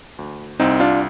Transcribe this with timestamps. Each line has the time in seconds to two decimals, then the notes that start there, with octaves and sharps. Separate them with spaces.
0.19 D2
0.60 C2 C4 D#4
0.80 D4 F4